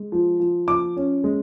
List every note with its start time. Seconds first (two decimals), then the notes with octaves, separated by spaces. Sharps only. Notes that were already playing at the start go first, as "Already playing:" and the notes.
Already playing: G#3
0.12 F3
0.40 F3
0.68 F3 D6
0.97 C#4
1.24 G#3